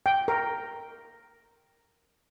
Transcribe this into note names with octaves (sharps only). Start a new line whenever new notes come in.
G5
A#4